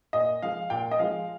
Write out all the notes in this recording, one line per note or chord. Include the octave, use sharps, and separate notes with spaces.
A#2 D#5
F3 G#3 F5
A#2 G5
D#5
F3 G#3 F5